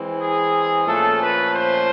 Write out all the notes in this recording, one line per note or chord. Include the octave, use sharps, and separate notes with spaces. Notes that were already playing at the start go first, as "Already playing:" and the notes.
Already playing: E3 G#3 C4
G#4
A#2 F3 A3 C#4 A4
B4
C5